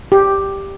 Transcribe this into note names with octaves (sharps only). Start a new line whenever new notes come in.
G4